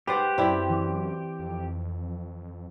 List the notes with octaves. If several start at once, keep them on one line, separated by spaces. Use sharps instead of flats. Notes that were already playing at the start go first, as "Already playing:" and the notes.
G#2 G4 B4 C5 F#5 G6 A6
F#2 C4 E4 D5
E3
F2